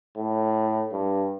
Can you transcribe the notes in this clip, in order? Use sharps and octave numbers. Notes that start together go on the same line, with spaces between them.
A2
G2